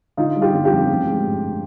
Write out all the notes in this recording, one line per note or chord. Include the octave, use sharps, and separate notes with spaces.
D3 D#4 F4
G3
F4 G4
G1
F4 G4
F2
A1
G#3
G2